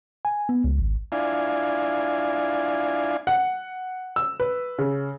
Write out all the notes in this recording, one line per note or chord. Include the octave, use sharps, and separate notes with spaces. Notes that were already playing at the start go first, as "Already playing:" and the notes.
G#5
B3
C#2
G#1
D4 E4 F4 D5 F5 G#5
F#5
E6
B4
C#3